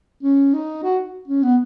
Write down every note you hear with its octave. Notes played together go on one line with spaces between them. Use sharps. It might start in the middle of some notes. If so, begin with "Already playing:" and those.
C#4
D#4
F#4
C#4
B3